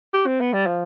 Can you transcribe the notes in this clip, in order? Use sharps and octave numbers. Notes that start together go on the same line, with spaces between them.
G4
C4
B3
G3
F3